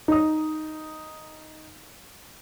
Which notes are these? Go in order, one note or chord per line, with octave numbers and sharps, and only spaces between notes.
D#4 D#6